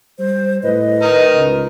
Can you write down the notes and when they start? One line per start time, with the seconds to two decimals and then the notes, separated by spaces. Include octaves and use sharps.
0.19 G3 C5
0.63 A2 B4 D#5
1.02 D#4 A#4
1.33 C#2